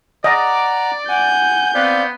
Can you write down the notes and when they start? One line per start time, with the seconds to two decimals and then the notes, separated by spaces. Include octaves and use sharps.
0.24 D5 D#5 F#5 A#5 D6
1.09 F#5 G#5 G6
1.75 B3 C4 D5 F5